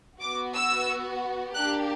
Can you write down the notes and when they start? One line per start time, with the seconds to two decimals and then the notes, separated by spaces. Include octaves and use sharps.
0.20 B3 F#4 D6
0.54 E6
1.55 A#3 D4 G4 F#6